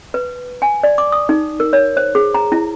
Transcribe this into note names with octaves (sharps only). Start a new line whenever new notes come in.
B4
G#5
D5
D6
D#6
D#4
A#4
C#5
C5
G#4
A#5
E4